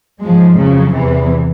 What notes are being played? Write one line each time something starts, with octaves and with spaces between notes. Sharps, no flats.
G#2 F3 G#3
F2 C#3 F#3
E2 C3 E3